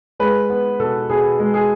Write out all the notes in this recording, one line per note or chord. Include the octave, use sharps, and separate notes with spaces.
G#3 B4
B3
B2 A4
B2 G#4
G#3
G#4